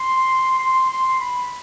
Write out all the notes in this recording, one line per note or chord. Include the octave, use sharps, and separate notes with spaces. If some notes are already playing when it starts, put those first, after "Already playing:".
Already playing: C6
C6
C6
B5